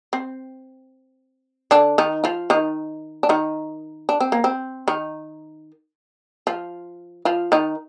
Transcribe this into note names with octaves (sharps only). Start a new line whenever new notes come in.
C4
D3 D4
D#3 D#4
F3 F4
D#3 D#4
D4
D#3 D#4
D4
C4
A#3
C4
D#3 D#4
F3 F4
F3 F4
D#3 D#4